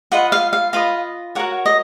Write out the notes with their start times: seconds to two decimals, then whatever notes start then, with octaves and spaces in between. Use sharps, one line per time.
0.12 F4 B4 D#5 F#5
0.32 F5
0.53 F5
0.73 F4 B4 D#5 F5
1.35 F#4 A#4 C#5 F#5
1.66 D#5